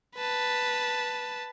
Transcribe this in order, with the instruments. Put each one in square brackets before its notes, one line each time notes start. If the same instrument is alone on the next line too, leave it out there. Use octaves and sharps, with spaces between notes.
[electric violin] B4 A5